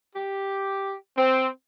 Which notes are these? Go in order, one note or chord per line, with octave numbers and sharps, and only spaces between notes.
G4
C4